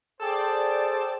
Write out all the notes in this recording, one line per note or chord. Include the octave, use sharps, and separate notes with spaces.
G#4 A4 C5 D5 G5 A5